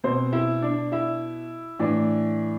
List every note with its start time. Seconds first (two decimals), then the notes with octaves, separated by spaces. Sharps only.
0.04 B2 C4 C5
0.33 E4 E5
0.62 D4 D5
0.92 E4 E5
1.79 A2 E3 D4 D5